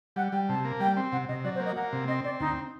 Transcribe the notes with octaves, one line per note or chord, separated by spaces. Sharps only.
G3 F#5
G3 G5
C3 A5
A#3
G3 G5
C4
C3 F#5
C3 D#5
F#3 D5
C5
A#3
D#5
A#3 F#5
C3
C4 D#5
C4 D5
D2 D#4